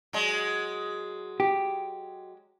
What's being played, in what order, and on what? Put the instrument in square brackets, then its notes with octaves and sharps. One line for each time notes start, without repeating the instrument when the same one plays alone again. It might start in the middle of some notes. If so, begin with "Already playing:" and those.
[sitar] F#3 G#3
[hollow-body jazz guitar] G4